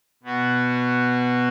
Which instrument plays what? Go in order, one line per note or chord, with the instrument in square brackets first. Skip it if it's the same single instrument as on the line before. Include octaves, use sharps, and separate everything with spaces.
[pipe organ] B2 B3 F#4